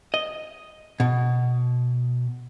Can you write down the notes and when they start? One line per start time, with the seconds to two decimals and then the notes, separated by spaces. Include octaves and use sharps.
0.14 D#5
1.00 B2